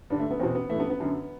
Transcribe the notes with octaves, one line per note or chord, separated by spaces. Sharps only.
G2 D3 D4
A3
B3
E2 B2 C4
B3
G2 E3 A3
B3
B3
F#2 D3